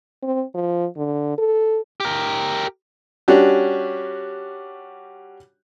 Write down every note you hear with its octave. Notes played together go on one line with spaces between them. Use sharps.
C4
F3
D3
A4
G4 A#4
G3 C#4 D4 F#4 G4